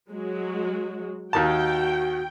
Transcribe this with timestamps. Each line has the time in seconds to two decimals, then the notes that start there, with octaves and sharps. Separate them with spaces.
0.11 F#3 G#3 F#4
1.33 D#2 D#3 F#4 G5 A5